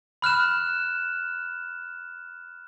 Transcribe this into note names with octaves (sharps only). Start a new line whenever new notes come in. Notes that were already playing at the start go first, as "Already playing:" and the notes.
B5 F6 F#6 E7